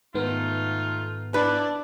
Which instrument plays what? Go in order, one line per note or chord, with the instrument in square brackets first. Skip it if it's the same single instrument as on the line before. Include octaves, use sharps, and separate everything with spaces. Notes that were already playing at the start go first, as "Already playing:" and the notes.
[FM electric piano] G#2 D#3 B3 [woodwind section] A3 D#4 F4
[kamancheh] D4 D5 [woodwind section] E4 [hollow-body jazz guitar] B4